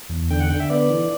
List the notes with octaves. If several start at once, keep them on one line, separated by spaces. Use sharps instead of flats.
E2
D3 G5
F#5
D3 G5
E5
B3 D5
E3